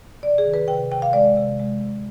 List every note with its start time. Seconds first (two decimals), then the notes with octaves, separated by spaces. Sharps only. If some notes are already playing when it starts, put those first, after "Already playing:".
0.22 C3 D5
0.38 G#4
0.46 D#3
0.54 B4
0.68 C3 G5
0.91 C3 G5
1.02 F5
1.13 G#3 D5
1.37 C3
1.60 G#3
1.82 C3